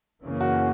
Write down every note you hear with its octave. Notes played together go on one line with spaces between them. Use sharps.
F#2 C#3 E3 A#3 C#4
F#4